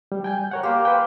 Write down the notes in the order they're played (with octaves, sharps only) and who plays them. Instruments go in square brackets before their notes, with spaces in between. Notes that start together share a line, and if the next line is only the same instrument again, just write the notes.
[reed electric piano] G3
G5 G#5 G6
A#4 C#5 F#5
[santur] A#3 [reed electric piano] G4 G5 C6
[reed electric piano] B4 G5